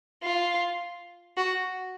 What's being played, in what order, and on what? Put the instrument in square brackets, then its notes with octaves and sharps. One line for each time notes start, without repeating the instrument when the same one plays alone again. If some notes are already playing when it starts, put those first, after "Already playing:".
[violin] F4
F#4